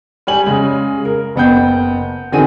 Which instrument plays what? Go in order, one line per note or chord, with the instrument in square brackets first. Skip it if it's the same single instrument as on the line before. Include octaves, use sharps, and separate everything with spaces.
[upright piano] G3 G4 C#5 G#5 F#7
C#3 G#3
A#4
F#1 B3 G5 G6
D3 D#3 C4 F#4 G#4 D#7